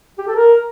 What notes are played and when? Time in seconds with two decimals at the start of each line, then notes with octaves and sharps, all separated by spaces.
0.18 G4
0.27 A4
0.36 A#4